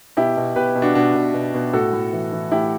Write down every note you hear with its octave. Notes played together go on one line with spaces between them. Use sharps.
B2 E4 G4
B2
B2 G4 B4
B2
D4 F#4
B2 D4 F#4
B2
B2
B2
A2 F#4 A4
A2
E3
E3
A2 E4 G4